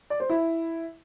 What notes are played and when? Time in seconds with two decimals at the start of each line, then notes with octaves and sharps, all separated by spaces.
0.10 D5
0.20 C5
0.30 E4